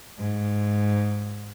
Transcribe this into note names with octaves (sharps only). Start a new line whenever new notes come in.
G#2